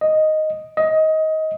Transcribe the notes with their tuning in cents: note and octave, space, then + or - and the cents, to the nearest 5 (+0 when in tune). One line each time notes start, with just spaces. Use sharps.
D#5 +0
D#5 +20